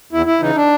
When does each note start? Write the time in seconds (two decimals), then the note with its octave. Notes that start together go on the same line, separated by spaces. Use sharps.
0.12 E2 E4
0.26 E4
0.41 C#3 E3 D#4
0.56 D4